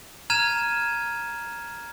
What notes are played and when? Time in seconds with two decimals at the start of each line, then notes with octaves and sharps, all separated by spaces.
0.30 A#5 F6 G#6 D#7 E7